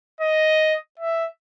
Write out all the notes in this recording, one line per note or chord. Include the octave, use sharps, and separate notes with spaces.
D#5
E5